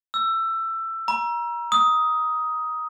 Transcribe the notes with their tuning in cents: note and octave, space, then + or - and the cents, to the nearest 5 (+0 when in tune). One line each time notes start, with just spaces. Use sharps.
E6 +20
A#5 +30
D#6 +10